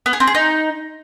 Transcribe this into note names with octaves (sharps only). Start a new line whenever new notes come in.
B3
G#4
C4
G#4
D#4